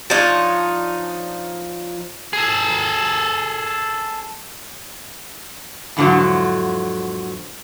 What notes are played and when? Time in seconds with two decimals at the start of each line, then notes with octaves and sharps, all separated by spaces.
0.10 F3 D4 D#4 C#5
2.33 G#4 A4
5.97 E2 G#2 D3 F3 F#3